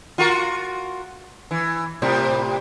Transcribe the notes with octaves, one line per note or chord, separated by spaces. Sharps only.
F4 F#4 A#4
E3
A2 C3 G3